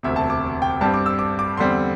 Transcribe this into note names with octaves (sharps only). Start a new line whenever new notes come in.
E1 D2 C3 E5
A5
D6
G5
G2 G3 C4 A5
D6
E6
D6
D6
E2 D3 G3 C4 C6